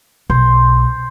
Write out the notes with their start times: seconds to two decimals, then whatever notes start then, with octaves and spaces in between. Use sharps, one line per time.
0.30 B1 C5